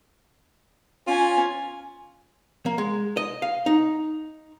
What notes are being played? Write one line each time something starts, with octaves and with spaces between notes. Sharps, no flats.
C#4 F4 G#5
A#3
G#3
D#5
F5
D#4